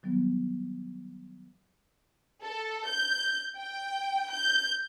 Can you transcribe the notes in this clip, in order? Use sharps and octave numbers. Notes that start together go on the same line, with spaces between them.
D#3 F#3 G3 B3
A4
G6
G5
G6